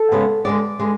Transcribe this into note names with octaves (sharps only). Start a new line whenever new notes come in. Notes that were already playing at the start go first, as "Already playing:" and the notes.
Already playing: A4
C#3 G#3 B3
D3 G#3 B3 D5
D3 G#3 B3